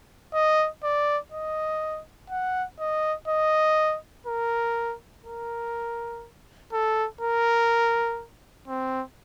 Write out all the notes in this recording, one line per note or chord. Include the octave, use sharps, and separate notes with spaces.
D#5
D5
D#5
F#5
D#5
D#5
A#4
A#4
A4
A#4
C4